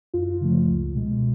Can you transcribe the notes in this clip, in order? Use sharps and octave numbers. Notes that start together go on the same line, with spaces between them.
F#2 F4
C#3 F3 A3
C#2
B2 G#3